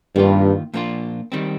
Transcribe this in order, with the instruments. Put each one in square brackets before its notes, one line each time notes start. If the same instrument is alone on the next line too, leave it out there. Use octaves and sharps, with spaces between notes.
[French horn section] G2 [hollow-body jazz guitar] D#3 A#3 F4
[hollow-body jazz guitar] A#2 F3 A#3 D4 F4
D#3 G3 C4